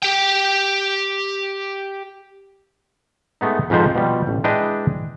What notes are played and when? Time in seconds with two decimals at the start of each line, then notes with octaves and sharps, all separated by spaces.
0.02 G4 G5
3.41 G#3 A3 B3 D#4
3.70 F2 G#2 F3 B4 C5
3.95 B2 F3 G3
4.27 A1
4.44 G#3 D4 E4 B4 D#5 G5